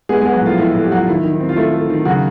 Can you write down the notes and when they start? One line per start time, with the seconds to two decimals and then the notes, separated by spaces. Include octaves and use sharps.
0.09 G#3 B3 G#4
0.22 G#3 G#4
0.25 B3
0.34 F#3 F#4
0.42 A2 F3 F4
0.58 A2 E4
0.75 A2
0.84 G4
0.91 F#3 F#4
1.00 F4
1.08 D#3 E4
1.24 D#3
1.40 C4
1.49 F4
1.56 A3 E4
1.73 A3
1.90 D#3
2.05 C#3 F#3 F#4